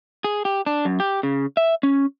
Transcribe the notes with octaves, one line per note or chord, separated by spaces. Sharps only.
G#4
G4
D4
F#2
G4
C#3
E5
C#4